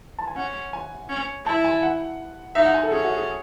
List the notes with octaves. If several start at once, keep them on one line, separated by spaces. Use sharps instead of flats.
A5
G#5
C#4 F#5
G#5
C#4
E4 A5
G#5
F#5
D#4 E5
F#5
G#5
A4
C#4 G#4
F#4
G#4